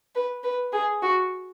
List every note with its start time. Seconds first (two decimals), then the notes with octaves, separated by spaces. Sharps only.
0.15 B4
0.44 B4
0.73 G#4
1.02 F#4